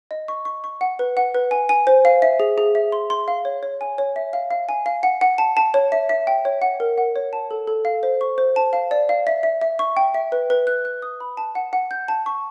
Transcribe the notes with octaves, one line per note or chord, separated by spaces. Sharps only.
D#5
C#6
C#6
C#6
F#5
B4
F#5
B4
G#5
G#5
C5
F5
E5
G#4
G#4
E5
C6
C6
F5
C#5
C#5
G#5
C#5
E5
F5
F5
G#5
F5
F#5
F#5
A5
A5
C#5
E5
E5
G5
C#5
F#5
A#4
F#5
C#5
A5
A4
A4
F5
C5
C#6
C5
A5
F5
D5
F5
E5
E5
E5
C#6
G5
E5
B4
B4
F#6
F#6
D#6
B5
A5
F#5
F#5
G6
A5
C#6